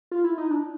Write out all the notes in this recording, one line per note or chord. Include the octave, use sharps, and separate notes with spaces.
F4
E4
D#4
D4